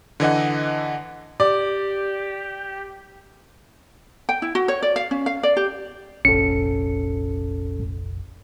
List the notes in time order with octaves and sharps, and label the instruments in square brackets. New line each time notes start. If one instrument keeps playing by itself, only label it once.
[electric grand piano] D3 E3 D#5 F#5
[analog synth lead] G4 [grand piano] D5
[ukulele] G5
E4
F#4
C#5
D5
F5
C#4
F5
D5
G4
[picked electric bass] F1 A#1 [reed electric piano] C#4 A4 [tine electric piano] C#7